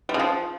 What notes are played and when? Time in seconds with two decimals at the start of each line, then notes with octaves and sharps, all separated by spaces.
0.09 G3
0.14 C#3
0.19 F3